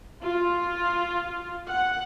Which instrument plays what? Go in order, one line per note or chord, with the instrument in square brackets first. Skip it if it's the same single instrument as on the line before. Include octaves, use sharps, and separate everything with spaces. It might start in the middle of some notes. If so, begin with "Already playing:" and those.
[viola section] F4
F#5